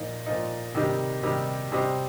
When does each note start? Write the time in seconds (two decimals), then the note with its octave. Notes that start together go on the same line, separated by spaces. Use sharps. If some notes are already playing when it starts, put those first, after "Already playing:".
Already playing: A#2 F3 D#4
0.26 A#2 F3 D#4
0.75 C3 D#3 G3 D#4 G4
1.23 C3 D#3 G3 D#4 G4
1.72 C3 G3 C4 G4 D#5